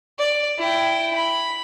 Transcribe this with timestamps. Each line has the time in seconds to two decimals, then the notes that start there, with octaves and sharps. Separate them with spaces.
0.19 D5
0.58 E4 G5
1.15 B5